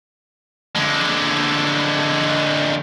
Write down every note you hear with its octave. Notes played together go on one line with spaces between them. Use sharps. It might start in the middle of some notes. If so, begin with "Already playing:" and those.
D3 G#3